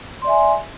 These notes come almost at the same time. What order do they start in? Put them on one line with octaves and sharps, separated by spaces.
C6 D5 E5 G#5